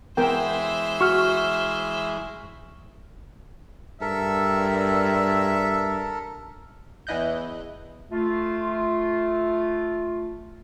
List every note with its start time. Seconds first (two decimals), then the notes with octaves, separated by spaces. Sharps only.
0.17 E3 G#3 B3 A#4 C5 E5 G5
1.01 F#4 C#6 F6
4.01 G2 A4 A#4 E5
7.07 E2 E3 E4 D#5 F#6 G6
8.12 A3 F4